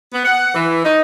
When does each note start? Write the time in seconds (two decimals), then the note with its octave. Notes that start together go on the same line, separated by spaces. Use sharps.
0.13 B3
0.25 F#5
0.54 E3
0.85 D#4